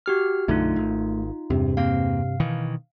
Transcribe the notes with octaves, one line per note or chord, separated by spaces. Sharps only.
F#4 G4 F6
B1 F#2 D3 A3 D#4 F4
G#1
E2 G2 C3
E2 A#3 C4 F5
B2 D#3 E3